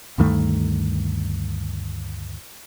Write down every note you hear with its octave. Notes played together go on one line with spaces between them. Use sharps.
D2 G2 D#3 A3